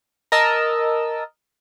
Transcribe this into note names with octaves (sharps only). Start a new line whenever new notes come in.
A#4 D#5 A5 E6